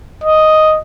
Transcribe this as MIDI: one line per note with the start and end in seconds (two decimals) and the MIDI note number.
0.24 0.79 75